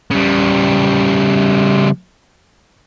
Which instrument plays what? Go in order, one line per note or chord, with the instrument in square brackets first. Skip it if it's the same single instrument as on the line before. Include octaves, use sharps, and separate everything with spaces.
[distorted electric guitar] C#3 G3